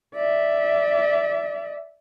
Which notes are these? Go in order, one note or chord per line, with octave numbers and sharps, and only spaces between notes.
D5 E5